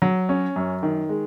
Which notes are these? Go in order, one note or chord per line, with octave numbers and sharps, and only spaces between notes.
F#3
C#4
F#2
D#3
G#3